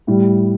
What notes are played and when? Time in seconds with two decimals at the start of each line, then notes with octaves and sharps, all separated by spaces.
0.07 A2 G3 E4 G4